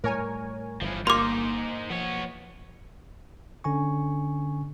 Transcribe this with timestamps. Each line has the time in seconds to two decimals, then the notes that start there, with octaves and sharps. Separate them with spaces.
0.04 A2 G3 A#4 C#5 G#5
0.81 G1 E3 F3
1.07 A#3 D#4 C5 C6 D6
1.90 F3 B3 C#5
3.64 D3 C#4 G#5 C#6